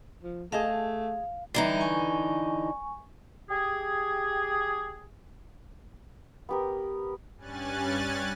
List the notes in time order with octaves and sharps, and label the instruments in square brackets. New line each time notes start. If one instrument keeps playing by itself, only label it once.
[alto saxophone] F3
[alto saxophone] A3 [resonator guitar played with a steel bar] G#4 D#5 A5 [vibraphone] F5
[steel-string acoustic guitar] D3 E3 D#4 [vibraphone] G3 E5 A#5
[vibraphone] G#5 C#6
[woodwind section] G4 G#4
[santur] B3 G4 A#4
[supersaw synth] G2 G3 C#4 G#5 F#6 A6